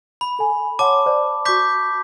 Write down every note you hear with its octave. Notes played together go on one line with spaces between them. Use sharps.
B5
A4 G#5
C#5 F#5 A5 C6 D6
C5 D5
F#4 C#6 D6 G6 B6